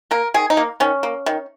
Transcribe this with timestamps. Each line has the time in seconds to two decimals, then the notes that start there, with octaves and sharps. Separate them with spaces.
0.11 A#3 A#4
0.34 D#3 G#4
0.50 D#4
0.57 A#3
0.80 D#3 C#4
1.03 A#3
1.26 D#3